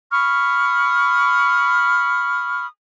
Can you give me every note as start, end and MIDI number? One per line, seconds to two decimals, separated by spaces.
0.10 2.66 83
0.10 2.66 85
0.10 2.66 87
0.10 2.66 89